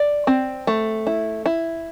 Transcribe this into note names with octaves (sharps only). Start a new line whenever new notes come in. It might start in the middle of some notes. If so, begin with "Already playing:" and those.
Already playing: D5
C4
A3
E4
E4